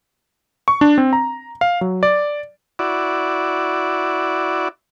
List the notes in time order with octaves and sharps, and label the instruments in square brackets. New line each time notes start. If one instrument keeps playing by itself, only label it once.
[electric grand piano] C#6
D4
C4
A#5
F5
F#3
D5
[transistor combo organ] E4 F#4 D5